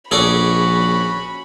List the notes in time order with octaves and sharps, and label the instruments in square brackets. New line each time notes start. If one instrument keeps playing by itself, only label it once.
[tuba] A#1 [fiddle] C#4 F#4 [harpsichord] G#4 A4 D5 [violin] B5